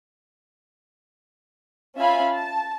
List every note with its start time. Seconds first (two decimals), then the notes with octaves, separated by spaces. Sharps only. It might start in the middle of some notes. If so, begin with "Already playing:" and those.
1.98 C#4 F4 E5 F5 G#5 B5
2.33 A5